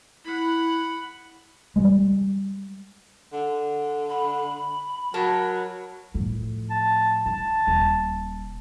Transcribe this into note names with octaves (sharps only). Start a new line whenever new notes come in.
E4 F#5 B5
G3 G#3
D3
B5
F#3 A#4 A5
A2 F3
A5
D3 A5
D#1